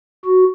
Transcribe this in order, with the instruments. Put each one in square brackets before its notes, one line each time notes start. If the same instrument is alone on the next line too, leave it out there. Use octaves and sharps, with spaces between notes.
[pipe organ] F#4